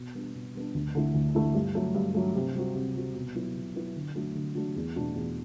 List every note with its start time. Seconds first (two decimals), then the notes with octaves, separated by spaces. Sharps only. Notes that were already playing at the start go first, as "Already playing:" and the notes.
Already playing: B2
0.15 G3 B3 D4
0.35 B2
0.54 G3 B3 D4
0.74 D2
0.95 D3 A3 E4
1.14 D2
1.35 D3 A3 E4
1.55 G2
1.75 F#3 A3
1.95 G2
2.15 F#3 A3
2.35 C3
2.55 G3 C4 F#4
2.75 C3
2.95 G3 C4 F#4
3.15 B2
3.35 F#3 B3 E4
3.56 B2
3.76 F#3 B3 E4
3.96 D3
4.15 F#3 A3 D4 F#4
4.35 D3
4.55 F#3 A3 D4 F#4
4.76 E2
4.96 B2 A3 D4 F#4
5.15 E2